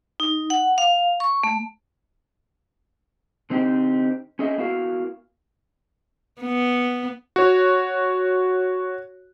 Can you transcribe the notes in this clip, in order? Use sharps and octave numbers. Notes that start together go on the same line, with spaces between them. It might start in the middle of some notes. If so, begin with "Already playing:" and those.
D#4
F#5
F5
C#6
A3
D3 C4 D#4 G4
C#4 G#4 D#5 E5
B3 E4 F#4 A#4 F5
B3
F#4 C#5